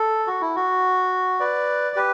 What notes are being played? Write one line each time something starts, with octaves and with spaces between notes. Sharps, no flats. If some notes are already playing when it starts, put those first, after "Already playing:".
Already playing: A4
F#4
E4
F#4
B4 D5
G4 B4